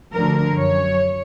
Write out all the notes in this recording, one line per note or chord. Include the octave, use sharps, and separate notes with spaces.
D2 D3 F3 A#4
F#2 C#5